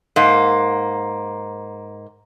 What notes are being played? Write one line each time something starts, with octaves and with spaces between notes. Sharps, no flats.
G#2 A#3